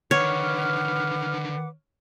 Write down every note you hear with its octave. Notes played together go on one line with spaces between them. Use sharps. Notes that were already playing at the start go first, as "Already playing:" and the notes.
D3 D#3 B4 C#5 F#5 D6 F6